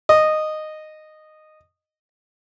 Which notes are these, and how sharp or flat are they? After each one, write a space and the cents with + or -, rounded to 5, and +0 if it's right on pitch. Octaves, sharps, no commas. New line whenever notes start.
D#5 -10